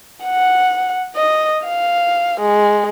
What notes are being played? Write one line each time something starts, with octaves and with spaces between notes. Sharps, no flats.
F#5
D#5
F5
G#3